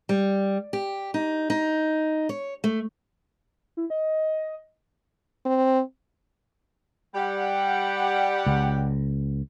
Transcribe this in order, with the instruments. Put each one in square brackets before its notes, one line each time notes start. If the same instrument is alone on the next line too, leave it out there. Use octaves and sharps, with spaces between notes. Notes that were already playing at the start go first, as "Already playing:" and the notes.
[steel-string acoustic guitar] G3
G4
D#4
D#4
C#5
A3
[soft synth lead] E4
D#5
[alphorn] C4
[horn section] G3 G4 F#5
[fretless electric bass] C#2